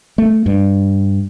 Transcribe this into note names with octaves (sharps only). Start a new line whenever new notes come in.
A3
G2